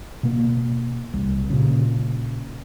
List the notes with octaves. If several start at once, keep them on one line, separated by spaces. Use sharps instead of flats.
B2 A#3
C2
A#2 C#3